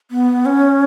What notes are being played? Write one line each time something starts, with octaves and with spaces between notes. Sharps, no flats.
B3
C#4